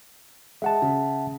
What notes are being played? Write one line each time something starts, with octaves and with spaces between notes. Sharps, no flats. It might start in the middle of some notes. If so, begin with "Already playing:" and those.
G#3 E5 F#5 A5
C#3